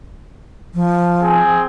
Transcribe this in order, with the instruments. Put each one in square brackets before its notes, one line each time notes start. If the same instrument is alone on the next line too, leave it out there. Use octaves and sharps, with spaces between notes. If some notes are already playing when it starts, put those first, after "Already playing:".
[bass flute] F3
[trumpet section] C4 G#4 G#5